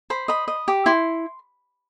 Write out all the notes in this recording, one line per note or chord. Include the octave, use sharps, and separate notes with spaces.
C5 B5
D#5 B5
D#5
G4
E4 C6